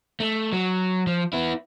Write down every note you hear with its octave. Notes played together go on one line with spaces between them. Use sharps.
A3
F#3
F3
B3 E4